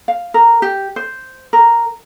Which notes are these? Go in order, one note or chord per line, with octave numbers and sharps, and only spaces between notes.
F5
A#4
G4
C5
A#4